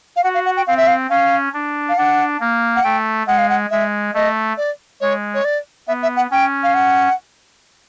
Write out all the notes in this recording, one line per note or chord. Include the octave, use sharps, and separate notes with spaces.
F5
F#4 F#5
F5
F#5
G5
C4 F5
E5
F5
C#4 F5
D4
F5
D4 F#5
A#3
F#5
A3 G5
G#3 F#5
F5
F#5
G#3 E5
A3 D#5
D5
G#3 C#5
C#5
D5
B3 E5
E5
F#5
C#4 G5
F5
F#5